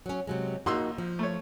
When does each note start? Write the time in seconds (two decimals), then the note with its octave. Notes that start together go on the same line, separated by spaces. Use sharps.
0.06 F#3 C#4
0.27 C3 F#3 G#3
0.66 A#1 A#3 D#4 F#4 C6 E6
0.98 F3
1.19 A3 C#5